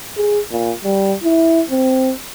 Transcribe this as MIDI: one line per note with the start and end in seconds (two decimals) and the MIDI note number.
0.17 0.39 68
0.51 0.71 46
0.84 1.14 55
1.23 1.62 64
1.70 2.12 60